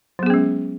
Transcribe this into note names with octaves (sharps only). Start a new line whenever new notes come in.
F#3 G#3 B3 C#4 G#4